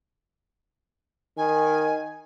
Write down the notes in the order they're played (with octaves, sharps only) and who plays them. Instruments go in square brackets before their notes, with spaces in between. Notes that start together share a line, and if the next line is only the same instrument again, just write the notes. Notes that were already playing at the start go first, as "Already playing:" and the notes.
[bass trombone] D#3 [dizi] G#5